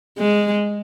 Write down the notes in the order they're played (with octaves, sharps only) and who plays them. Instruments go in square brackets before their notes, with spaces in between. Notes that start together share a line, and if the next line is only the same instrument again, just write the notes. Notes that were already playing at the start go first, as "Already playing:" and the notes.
[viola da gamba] G#3